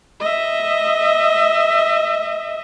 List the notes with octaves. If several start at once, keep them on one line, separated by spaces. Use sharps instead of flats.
D#5 E5